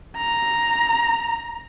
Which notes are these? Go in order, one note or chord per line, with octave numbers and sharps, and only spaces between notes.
A#5